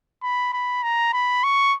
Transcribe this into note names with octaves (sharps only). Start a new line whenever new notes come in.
B5
B5
A#5
B5
C#6